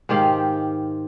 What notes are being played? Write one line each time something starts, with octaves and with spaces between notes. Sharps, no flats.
G#2 D#3 G4 F5